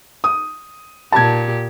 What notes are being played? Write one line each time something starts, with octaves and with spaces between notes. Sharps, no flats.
D#6
A#2 G4 A5 G#6